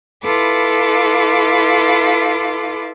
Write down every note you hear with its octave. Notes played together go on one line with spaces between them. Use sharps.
E4 F4 A4 B4 D6